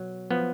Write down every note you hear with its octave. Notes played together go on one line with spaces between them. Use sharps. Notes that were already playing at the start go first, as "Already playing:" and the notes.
Already playing: B2 F#3
F3 B3